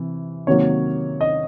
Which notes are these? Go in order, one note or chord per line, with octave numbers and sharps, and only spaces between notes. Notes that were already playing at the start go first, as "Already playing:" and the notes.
Already playing: C3 E3
C3 D#3 F#3 A#3 C#5
D#5